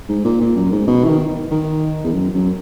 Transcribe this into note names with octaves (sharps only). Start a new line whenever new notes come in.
G#2
A#2
A#2
F#2
G#2
B2
E3
D#3
D#3
E2
F#2
F#2